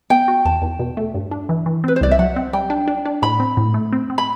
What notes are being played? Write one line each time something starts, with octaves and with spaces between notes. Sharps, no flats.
B3 G5
F#4
E2 A5
E2
B2
A3
G2
D4
E3
E3
C4 B4
C5
C2 D5
E5
F#3 F#5
C4
G3 G5
D4
D4
D4
A2 B5
C4
A2
A3
C4
C4
B5